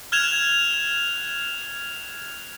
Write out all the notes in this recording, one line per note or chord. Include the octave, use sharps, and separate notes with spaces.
F6 F#6 G#6 E7 F7